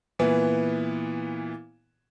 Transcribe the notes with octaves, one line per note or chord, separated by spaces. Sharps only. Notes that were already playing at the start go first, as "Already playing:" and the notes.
A#2 E3 B3